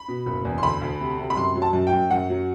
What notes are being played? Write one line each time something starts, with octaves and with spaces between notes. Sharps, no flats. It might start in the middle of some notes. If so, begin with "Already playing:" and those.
Already playing: B5
B2
F#1
E2
C6
D2 B5
D2
C3
C3
B5
F#2 C6
F#3
A5
F#2
G5
F#2
F#2 F#5
F#3